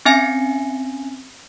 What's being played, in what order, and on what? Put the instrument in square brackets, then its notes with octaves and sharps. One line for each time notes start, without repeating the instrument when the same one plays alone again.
[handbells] C4 C#4 E5 G#5 A#6 C#7